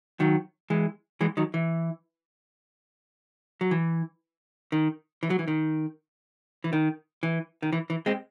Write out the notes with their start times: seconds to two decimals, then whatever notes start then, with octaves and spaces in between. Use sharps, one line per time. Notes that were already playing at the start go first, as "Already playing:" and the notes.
0.20 D#3 F#3
0.70 E3 G#3
1.21 E3 G#3
1.37 D#3 F#3
1.54 E3
3.61 F#3
3.71 E3
4.72 D#3
5.23 E3
5.30 F#3
5.39 E3
5.48 D#3
6.64 E3
6.73 D#3
7.23 E3
7.62 D#3
7.73 E3
7.90 E3
8.06 G#3 C4